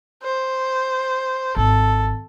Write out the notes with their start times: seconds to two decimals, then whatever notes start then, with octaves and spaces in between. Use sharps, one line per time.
0.23 C5
1.56 G#1 A4